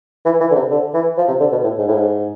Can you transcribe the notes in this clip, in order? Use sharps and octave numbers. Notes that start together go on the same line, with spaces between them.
E3
E3
D3
C3
D3
E3
F3
C3
D3
B2
A2
G#2
A2
G#2